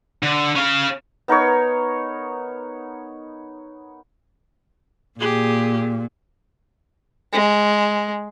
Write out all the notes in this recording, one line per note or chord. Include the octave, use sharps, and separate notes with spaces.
D3
C#4 F5
B3 D#4 A#4 C#5
A#2 G4 G#4
G#3